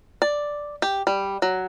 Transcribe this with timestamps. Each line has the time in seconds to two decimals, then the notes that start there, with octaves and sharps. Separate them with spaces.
0.22 D5
0.82 G4
1.07 G3
1.42 F#3